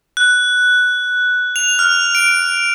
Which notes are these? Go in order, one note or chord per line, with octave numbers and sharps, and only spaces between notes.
F#6
F7
F6
D7